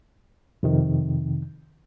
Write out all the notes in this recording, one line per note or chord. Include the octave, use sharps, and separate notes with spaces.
F2 C3 D#3